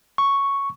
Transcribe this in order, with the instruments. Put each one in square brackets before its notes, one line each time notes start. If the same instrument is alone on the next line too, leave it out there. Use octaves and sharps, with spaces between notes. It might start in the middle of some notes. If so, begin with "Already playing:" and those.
[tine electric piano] C#6